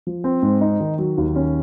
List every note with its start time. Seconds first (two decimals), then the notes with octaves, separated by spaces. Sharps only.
0.07 F3
0.24 C4
0.42 G#2
0.61 D#4
0.80 D#3
0.99 F#3
1.18 D#2
1.36 C#4